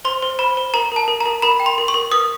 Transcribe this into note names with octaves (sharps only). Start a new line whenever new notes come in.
C5 C6
C5
C5 B5
C5
A#4 A#5
A#4 A5
A#4
A#5
A#4
A#4 B5
G5
C6
A#4
C#6
A#4
B4 D#6